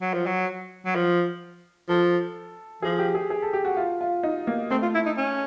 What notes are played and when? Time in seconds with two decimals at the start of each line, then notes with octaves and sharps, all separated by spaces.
0.01 F#3
0.14 F3
0.26 F#3
0.86 F#3
0.95 F3
1.89 F3 A4
2.82 F3 G#4
2.99 G4
3.15 G#4
3.30 G#4
3.42 A4
3.53 G4
3.65 F#4
3.77 F4
4.01 F4
4.23 D#4
4.47 A#3
4.70 A3 C4
4.82 F4
4.94 E4
5.06 D#4
5.18 C#4